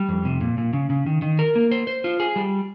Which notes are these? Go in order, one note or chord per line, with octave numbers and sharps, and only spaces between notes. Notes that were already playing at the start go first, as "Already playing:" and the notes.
Already playing: G3
F2
C3
A#2
A#2
C#3
C#3
D#3
D#3
A#4
A#3
C5
C5
F4
G#4
G3